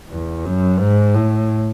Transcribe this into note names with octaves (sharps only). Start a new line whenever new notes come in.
E2
F#2
G#2
A2